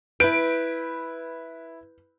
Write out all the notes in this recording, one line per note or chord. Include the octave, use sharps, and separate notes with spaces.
E4 B4 G6 D7